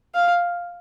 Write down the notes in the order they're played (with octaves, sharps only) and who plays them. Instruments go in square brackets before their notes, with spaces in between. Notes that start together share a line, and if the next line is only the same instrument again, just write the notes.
[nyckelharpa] F5